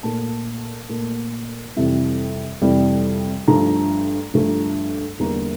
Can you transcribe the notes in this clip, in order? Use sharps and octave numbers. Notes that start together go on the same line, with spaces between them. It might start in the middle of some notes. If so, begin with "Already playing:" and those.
A#2 A3 A5
A#2 A3
F2 C3 E3 G3
F2 C3 E3 G3
G2 F3 A3 A#5
G2 F3 A3
E2 D3 G3 A#3 A#5